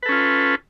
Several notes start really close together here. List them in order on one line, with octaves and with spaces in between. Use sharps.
B4 A4 C#4 F4